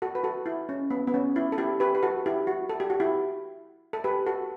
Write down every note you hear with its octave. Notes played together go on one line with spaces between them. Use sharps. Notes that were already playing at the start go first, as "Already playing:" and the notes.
F#4 A4
B4
F#4 A4
E4
C#4
B3
B3
C#4
E4
A4
E4 G4
G4 B4
B4
F#4 A4
E4 G4
F#4
A4
G4
F#4
E4 G4
A4
G4 B4
F#4 A4